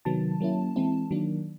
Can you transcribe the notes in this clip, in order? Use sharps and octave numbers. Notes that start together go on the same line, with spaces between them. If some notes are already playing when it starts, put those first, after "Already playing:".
C3 D#3 F#3 B3 A5
F#3 A#3 C#4 E4
E3 G#3 C4 E4
D#3 F#3 A#3 D4